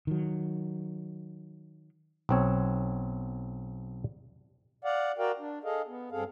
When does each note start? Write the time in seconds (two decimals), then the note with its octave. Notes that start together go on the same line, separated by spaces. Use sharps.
0.07 D#3 F#3
2.29 B1 C4 C#5
4.84 D5 F5 F#5
5.18 F#4 A#4 D5 F5 G5
5.39 D4
5.64 G#4 A4 D#5 F5
5.88 B3
6.12 G2 C4 G#4 A4 F5